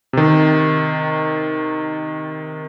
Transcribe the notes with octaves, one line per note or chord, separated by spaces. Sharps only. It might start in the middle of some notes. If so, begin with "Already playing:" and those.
C3 D#3